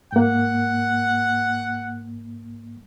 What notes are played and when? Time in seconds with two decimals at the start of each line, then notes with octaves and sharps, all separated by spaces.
0.12 G#2 A#3 F#5